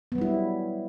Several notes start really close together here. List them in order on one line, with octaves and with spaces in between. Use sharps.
B3 F#3 G3 E4